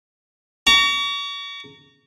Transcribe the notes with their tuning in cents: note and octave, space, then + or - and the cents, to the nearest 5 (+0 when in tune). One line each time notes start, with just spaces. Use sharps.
A#5 -20 C#6 +40